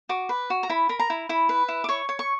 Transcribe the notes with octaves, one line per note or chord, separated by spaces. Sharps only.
F#4 D6
B4
F#4
A#5
E4 B5
A#4 B5
A#5
E4
E4 B5
B4
E4
D6
C#5 C#6
C#5
C#6